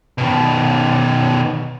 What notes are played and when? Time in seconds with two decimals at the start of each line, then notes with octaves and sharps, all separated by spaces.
0.18 B2 D#3